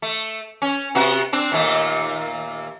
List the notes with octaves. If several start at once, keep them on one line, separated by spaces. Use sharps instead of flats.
A3
C#4
C3 B3 F#4
C4 D4
D#2 A#2 A3